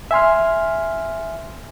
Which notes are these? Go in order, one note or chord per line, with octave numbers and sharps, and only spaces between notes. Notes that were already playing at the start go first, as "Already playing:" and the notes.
E5 G#5 C6 F6